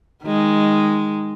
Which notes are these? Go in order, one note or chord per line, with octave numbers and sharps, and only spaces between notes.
D#3 G#3